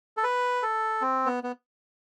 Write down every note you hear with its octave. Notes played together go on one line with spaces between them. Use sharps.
A4
B4
A4
C4
B3
B3